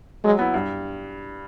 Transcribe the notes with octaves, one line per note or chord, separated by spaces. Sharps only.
F#3 G#3
B3 E4
G2